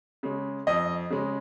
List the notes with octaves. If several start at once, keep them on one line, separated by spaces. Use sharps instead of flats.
C#3 G#3
F2 D#5
C#3 G#3